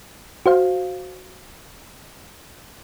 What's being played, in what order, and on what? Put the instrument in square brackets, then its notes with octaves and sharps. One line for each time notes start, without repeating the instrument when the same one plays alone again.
[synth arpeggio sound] F#4 C5 F5